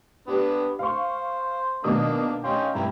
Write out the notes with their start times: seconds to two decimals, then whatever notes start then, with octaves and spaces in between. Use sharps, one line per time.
0.27 B3 D4 G4
0.79 C5 F5 C#6
1.84 B2 D#3 A#3 D4 D#6
2.44 C#4 D#4 F5 G5 C6
2.75 G2 E4 G4 A#5